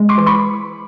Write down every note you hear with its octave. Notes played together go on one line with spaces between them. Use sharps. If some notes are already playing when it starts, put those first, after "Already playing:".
Already playing: G#3
C6 D6
E3
B5 C#6